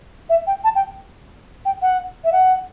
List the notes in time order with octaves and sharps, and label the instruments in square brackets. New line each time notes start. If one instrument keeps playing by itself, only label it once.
[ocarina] E5
G5
A5
G5
G5
F#5
E5
F#5